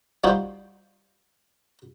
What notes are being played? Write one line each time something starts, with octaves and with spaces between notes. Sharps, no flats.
G3 D#4 F4 F#4 C5